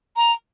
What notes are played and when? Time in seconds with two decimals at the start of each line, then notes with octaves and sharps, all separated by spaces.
0.16 A#5